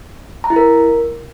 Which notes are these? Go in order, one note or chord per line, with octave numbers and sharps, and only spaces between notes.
A#5
E4
A#4